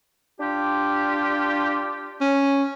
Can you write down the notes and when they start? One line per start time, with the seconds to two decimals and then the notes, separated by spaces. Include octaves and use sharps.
0.40 D4 F4 G4
2.21 C#4